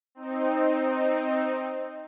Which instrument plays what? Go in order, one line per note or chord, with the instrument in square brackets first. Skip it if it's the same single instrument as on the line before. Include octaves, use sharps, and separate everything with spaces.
[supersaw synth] C4 D#4